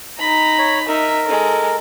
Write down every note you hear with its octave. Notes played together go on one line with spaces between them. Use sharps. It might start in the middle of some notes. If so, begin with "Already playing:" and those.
D#4 A#5 B5
C#5
D#4 A#4 E5
G#3 A4